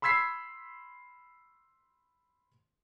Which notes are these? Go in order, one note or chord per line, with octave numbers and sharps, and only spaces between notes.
B5 C6 E6 G#6 B6 C7